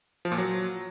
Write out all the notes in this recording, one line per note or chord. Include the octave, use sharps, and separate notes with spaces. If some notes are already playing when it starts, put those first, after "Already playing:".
F3
A#2
F#3